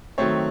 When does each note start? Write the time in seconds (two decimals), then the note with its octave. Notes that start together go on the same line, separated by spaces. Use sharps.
0.18 D#3 F#3 A3 C4 C#5